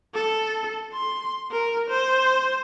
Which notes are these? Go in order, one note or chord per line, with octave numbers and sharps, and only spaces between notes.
A4
C6
A#4
C5